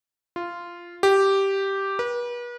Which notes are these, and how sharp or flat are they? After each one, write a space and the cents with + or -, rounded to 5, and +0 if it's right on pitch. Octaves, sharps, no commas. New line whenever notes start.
F4 -10
G4 -5
B4 -40